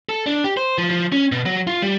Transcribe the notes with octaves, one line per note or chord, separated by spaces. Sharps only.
A4
D4
G4
C5
F3
F3
C#4
B2
F#3
F4
G3